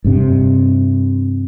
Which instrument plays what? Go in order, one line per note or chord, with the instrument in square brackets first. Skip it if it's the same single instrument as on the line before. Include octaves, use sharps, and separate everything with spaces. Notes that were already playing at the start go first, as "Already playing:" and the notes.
[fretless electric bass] G2 C3